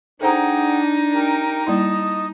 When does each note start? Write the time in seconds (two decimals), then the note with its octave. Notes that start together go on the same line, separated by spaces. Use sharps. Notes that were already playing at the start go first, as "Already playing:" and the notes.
0.21 D4 D#4 G#4 A4 C5 F#5 G5 A#5
1.13 G4 A#4 G5
1.67 G3 A#3 E4 D#5 A5 D#6